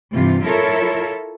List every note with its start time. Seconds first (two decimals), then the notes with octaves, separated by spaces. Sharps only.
0.13 G2 C3 E3 F4
0.44 E4 F4 A4 A#4 C#5 E5